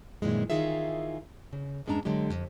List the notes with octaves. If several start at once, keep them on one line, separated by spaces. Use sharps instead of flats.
F#2 A#2 D#3 E3 G#3
D#3 E3 D#4 F4 G#4 E5
C#3
E2 G2 G#3 C#4 D4 A#5
D3 F#3 G#3 G4
F2